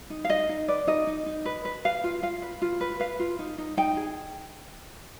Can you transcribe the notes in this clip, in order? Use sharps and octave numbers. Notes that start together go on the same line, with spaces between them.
D#4
F5
D#4 D#5
D#4
B4 D5
D#4 D#5
D#4
D#4
B4
B4
B4 F5
F4
F4 F5
B4
F4
B4
B4 F5
F4
D#4
D#4
D#4 G5
G#4